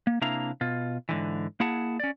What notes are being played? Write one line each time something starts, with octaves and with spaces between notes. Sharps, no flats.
A#3
C3 A#3 D4 E4 F5 A#5
B2 F4
G#2 D3 E3
A#3 E4 G#4 F#5 A5
C#4 D5